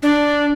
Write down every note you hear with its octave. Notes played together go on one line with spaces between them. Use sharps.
D4